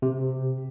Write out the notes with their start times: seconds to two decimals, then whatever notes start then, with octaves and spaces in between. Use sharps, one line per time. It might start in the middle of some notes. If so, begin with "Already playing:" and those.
0.02 C3